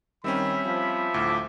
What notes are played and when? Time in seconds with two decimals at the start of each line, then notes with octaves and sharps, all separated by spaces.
0.24 D#3 G3 C4 C#4 E5 B5
0.65 F3
1.14 D2 A2 D6